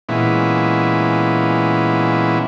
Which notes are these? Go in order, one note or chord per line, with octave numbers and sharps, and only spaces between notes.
A#2 E3 G#3 B3 C#4 E4